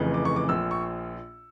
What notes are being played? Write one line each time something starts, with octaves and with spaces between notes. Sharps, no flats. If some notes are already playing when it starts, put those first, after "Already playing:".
Already playing: F1 F2 C#3 E3
D6
C#6
D6
A#1 A#2 F3 E6
C#6